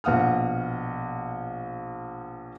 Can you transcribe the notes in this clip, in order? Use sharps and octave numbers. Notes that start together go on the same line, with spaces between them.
A#1 B2 F#5 D#6 F6